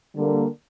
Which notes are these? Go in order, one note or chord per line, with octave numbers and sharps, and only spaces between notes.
D3 G3 A#3